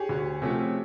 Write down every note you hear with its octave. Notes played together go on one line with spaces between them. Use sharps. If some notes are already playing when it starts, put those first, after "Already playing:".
Already playing: G4 G#4 C#5
D2 F#4
C3 F3 A3 C#4